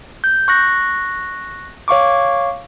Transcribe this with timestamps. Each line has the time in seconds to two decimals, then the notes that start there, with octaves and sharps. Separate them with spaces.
0.24 G6
0.48 C#6 F#6 A#6
1.88 C#5 F5 C#6 D6